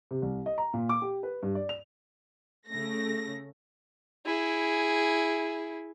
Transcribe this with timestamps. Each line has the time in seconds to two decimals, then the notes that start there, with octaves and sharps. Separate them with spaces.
0.11 C3
0.22 C2
0.46 D#5
0.58 A#5
0.74 A#2
0.89 D6
1.02 G4
1.23 B4
1.43 G2
1.55 D5
1.69 F7
2.68 C#3 A3 A#6
4.26 E4 G#4